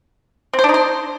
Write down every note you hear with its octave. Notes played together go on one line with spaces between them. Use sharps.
C4
C5
D4
D#4
C5